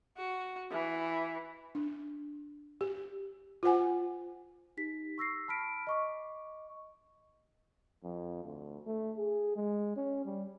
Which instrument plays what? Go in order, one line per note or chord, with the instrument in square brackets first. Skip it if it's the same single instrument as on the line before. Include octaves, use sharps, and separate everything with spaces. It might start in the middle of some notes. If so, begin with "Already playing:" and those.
[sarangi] F#4
E3
[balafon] D4
G4
F4 C5 F#5 G#5
[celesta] D#4 G4 B6
C#6 E6 A#6 C7
A5 B5 F6 B6 D7
D#5 C#6 D6
[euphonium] F2
D2
A3
G#4
G#3
C#4
G3